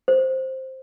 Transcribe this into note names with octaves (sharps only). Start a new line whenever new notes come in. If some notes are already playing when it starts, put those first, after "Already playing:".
C5